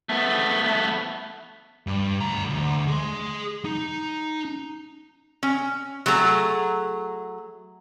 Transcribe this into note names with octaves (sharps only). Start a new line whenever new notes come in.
A3 B3
G2
D2 A#5
D2
G#4 C6
D#4
C#4
F#3 A3 G#4 A#5